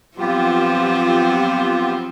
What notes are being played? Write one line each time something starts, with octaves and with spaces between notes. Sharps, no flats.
F3 F#3 B3 C4 F4 G4